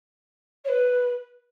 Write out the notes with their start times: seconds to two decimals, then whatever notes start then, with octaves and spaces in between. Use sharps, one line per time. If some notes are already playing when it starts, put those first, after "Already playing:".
0.64 C#5
0.68 B4